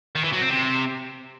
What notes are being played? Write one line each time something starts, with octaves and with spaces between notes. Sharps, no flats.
D#3
E3
F#3
C4
C3